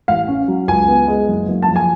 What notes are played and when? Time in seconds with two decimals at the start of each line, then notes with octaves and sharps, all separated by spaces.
0.08 A1 F5
0.28 C#4
0.48 F#3
0.68 C#2 G#5
0.88 B3
1.08 G#3
1.28 F#1
1.48 F#1
1.62 A5
1.68 F3
1.76 G#5